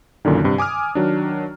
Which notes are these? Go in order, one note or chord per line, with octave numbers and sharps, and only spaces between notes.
C#2 F#2 A#2 D3 D#3
G2 C3
G#5 D6 D#6 F6
D#3 F#3 D4